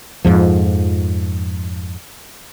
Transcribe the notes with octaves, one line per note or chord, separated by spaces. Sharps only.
F2 G#2 F3